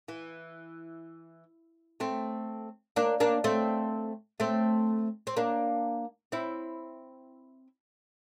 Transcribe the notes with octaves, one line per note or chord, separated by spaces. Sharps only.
E3
A3 C4
A#3 D4
A#3 D4
A3 C4
A3 C4
C4
A#3 D4
C4 E4